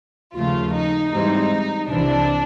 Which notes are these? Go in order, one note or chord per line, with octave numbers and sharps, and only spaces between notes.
D#2 C#3 F3 A3 F4
D#4
G#2 E3 G3 C4 D#4
C2 C3 E3 D4